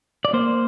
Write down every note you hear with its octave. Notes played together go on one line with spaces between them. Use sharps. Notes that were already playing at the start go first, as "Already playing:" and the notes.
D5
A#3 C5